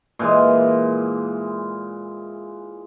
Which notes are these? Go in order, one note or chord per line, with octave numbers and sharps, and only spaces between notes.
A#2 E3 G#3